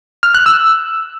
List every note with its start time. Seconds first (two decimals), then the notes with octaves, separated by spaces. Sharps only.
0.23 F6
0.34 F#6
0.46 E6